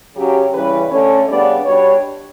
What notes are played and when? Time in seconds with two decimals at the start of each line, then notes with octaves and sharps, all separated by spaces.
0.16 C#3 F#3 C#4 G4
0.53 C#3 E3 G3 C#4 B4
0.91 D3 A3 C#4 C#5
1.28 C#3 G3 B3 D4 D5
1.65 B2 G3 D4 C#5